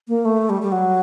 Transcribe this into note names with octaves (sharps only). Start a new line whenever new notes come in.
A#3
A3
G3
G3
F#3